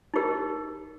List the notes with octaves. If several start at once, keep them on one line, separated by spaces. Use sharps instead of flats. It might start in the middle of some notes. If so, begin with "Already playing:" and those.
D#4 G4 A#4